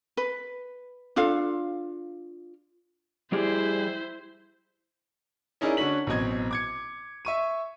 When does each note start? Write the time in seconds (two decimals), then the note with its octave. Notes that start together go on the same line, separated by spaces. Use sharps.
0.17 B4
1.16 D4 F4 A4 F5
3.32 G3 E4 G4 G#4 C5
5.61 C#4 D#4 E4 G#4 A#4 D5
5.77 D3 C#4 F#4 C#5 B6 F#7
6.07 A1 B2 F#3 C4 D#5 G#6
6.51 D6 G#6 C#7
7.25 E5 C#6 D#7